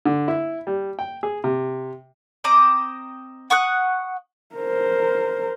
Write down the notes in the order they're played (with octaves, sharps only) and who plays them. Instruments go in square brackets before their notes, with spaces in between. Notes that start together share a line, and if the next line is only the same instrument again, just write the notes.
[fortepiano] D3
E4
G3
G5
G#4
C3
[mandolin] C4 D#5 A#5 D6
F#5 C#6 D#6 F#6
[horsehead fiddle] A#4 C5